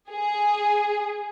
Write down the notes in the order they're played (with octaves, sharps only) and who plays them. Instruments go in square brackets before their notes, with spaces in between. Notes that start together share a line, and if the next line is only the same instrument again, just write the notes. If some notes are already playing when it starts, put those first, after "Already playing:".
[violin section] G#4